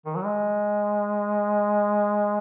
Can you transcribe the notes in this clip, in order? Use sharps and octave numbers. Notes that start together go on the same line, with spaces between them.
D#3
F#3
G#3